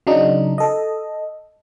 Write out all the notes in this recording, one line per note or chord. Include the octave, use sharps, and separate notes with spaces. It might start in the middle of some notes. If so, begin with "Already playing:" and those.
C#3 F#3 D4 D#4
A4 D#5